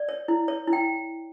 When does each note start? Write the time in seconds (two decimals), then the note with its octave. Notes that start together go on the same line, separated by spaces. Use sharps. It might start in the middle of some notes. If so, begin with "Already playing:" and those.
Already playing: D5
0.09 C#5
0.28 E4
0.48 C#5
0.67 E4
0.73 G5